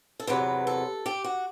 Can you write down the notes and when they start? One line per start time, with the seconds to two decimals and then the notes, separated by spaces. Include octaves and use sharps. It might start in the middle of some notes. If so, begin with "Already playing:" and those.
0.20 A4
0.27 E2 C3 F#3 B4
0.67 A4
1.06 G4
1.24 F#4